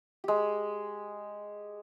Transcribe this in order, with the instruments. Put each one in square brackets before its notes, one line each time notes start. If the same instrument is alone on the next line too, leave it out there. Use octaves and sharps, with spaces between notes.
[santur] G#3 G4